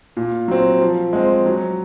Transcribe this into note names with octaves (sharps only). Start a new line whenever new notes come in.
A#2
F#3 C4
F3
G#3 C4
F#3